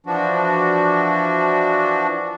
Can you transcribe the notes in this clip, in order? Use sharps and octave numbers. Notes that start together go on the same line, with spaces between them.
E3 F3 D4 F#4